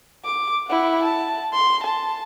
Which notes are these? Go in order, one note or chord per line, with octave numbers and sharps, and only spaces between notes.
D6
E4 F#5
A5
C6
A5